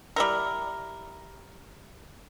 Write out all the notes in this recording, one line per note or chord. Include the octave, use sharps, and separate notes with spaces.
G3 E4 A#4